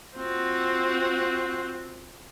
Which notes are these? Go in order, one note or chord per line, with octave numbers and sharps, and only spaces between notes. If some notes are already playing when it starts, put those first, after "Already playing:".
C4 F4 F#4